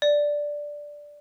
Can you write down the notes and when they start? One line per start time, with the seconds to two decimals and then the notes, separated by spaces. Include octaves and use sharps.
0.02 D5